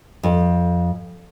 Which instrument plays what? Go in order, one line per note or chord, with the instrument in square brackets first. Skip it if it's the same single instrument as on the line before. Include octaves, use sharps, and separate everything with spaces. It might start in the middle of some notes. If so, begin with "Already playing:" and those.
[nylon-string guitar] F2